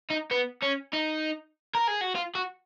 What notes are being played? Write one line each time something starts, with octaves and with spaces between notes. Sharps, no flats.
D#4
B3
C#4
D#4
A#4
G#4
F#4
F4
F#4